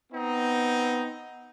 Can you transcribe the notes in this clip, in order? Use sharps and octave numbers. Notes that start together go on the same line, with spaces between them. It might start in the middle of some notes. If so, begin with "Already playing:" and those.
B3 C4 D#4